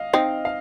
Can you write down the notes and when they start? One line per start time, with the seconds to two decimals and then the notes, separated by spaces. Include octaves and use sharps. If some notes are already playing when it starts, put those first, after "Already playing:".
Already playing: D#5 F5
0.14 C4 D#4 D#5
0.45 F5